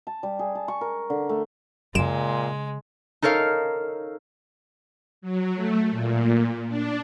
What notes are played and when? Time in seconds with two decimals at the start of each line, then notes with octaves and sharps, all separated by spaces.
0.07 A5
0.23 G3
0.39 G#4
0.55 A5
0.68 C#6
0.81 A#4
1.10 D3
1.29 A3
1.95 F#2 A#2 C#3 G#3 D7 E7
3.22 D#4 A4 A#4 C#5 F5
5.22 F#3
5.55 A3
5.90 A#2
6.68 D4